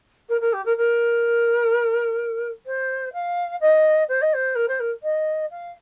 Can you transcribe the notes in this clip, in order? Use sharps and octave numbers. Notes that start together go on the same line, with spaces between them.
A#4
A#4
G4
A#4
A#4
C5
F5
D#5
C5
D#5
C5
A#4
C5
A#4
D#5
F5